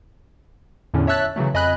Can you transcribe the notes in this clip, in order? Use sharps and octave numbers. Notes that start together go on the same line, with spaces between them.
E2 A2 D3 C#4
C#5 E5 A5 E6 F#6 A6
C#3 E3 F#3 A3
F2 D#5 G#5 B5 F#6